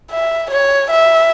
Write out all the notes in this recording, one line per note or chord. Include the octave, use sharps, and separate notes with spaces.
E5
C#5
E5